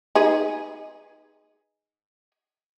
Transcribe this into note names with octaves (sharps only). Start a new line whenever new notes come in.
D#4 G#4 B4